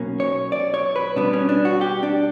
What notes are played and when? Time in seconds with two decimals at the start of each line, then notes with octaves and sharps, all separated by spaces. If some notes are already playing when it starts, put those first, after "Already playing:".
Already playing: B1 B2 A#3 C#4
0.20 C#5
0.52 D5
0.74 C#5
0.96 B4
1.16 B2 G3 B3 D4
1.33 C#4
1.49 D4
1.65 F#4
1.81 G4
2.03 D4